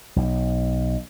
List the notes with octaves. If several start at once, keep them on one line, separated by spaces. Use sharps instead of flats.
B1